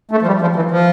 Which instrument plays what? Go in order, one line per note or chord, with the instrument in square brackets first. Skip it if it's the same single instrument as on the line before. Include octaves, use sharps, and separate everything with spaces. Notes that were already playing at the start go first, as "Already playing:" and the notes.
[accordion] A3
F3
G3
F3
E3
F3